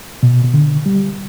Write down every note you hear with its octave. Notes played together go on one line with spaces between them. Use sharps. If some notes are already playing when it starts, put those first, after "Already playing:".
B2
B2
D3
G3